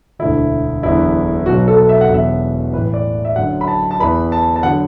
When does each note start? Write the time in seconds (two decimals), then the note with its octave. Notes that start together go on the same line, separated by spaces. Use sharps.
0.19 E1 D2 D3 E4
0.82 F#1 E2 D3 E4
1.46 B1 B2 F#3 F#4
1.68 A4
1.89 E5
2.01 F#5
2.10 E1 E2 B2 F#3 E5
2.73 A1 A2 E3 B4
2.94 D5
3.25 E5
3.36 F#1 F#2 D3 F#3 F#5
3.61 B5
3.68 A5
3.91 A5
4.00 E2 E3 B5
4.32 A5
4.56 A5
4.63 D3 F#3 F#5